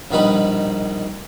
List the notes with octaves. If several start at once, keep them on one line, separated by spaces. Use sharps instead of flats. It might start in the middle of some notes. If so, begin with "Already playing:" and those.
A#1 B2 D#3 G3 D#4 B4